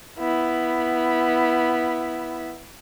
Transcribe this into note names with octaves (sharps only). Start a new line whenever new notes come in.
B3 E4